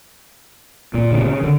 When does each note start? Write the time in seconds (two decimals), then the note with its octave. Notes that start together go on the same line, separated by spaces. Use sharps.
0.94 A#2
1.12 D3
1.19 C#3
1.43 D3